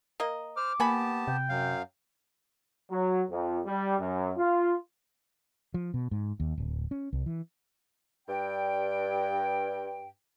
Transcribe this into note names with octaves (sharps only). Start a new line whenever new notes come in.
A#3 D#5
C5 D6 F6
A#3 B3 G4 F#5 G#5 A5 B5
C3 G5
F#2 F#3 F5
F#3
F2
G3
F#2
F4
F3
B2
G#2
D#2
D1
C#4
C2
E3
G2 G5